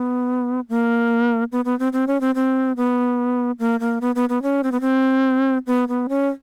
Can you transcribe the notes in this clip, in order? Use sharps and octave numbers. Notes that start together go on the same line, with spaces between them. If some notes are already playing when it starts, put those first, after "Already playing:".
Already playing: B3
A#3
B3
B3
C4
C4
C#4
C4
C4
B3
A#3
A#3
B3
B3
B3
C#4
C4
B3
C4
B3
B3
C#4